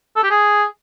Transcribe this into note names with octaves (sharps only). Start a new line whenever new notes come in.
A4
G4
G#4